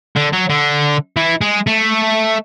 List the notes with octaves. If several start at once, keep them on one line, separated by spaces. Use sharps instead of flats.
D3
F#3
D3
E3
G#3
A3